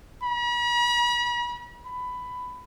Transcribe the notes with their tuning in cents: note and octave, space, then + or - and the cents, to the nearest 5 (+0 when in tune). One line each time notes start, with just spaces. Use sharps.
B5 -45
B5 +15